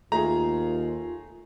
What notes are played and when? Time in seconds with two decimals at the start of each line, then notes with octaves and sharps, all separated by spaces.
0.12 D#2 A3 F4 G#4 A#5